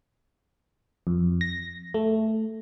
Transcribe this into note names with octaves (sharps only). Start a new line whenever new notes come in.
F2
A#6
A3